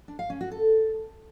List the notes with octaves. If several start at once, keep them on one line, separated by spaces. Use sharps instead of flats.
D4
F5
C#4
F#4
A4